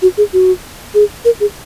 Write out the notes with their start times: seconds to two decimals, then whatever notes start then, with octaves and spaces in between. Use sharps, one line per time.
0.02 F#4
0.18 G#4
0.33 F#4
0.94 G#4
1.25 A#4
1.40 G#4